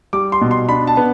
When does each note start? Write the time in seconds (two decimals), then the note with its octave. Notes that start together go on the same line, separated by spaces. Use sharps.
0.13 G3 D6
0.32 C6
0.41 B2
0.51 C6
0.68 D4 B5
0.87 A5
0.97 B3